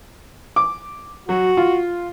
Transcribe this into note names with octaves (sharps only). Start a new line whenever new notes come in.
D6
F#3 F#4
F4